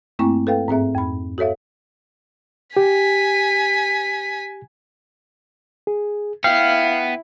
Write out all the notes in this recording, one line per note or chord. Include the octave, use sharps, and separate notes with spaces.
G2 A3 A#3 C4 E4 C#6
A4 B4 F5 G5
G#2 C4 G#4 E5
F2 B5
F#4 A4 C#5 E5 F5
G4 G#5 B6
G#4
B3 E4 F5 G5